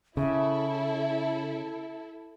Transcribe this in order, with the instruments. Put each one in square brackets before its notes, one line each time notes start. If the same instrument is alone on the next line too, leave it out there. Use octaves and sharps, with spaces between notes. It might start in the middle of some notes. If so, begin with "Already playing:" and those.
[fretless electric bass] C#3 [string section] E4 A4 [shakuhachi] E5